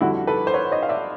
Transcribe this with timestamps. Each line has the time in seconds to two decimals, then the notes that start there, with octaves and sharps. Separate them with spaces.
0.01 F2 D3 G3 E4 F#4
0.27 A4 B4
0.47 C5
0.54 B4 C#5
0.71 C#5 D#5
0.83 F5
0.89 D5 E5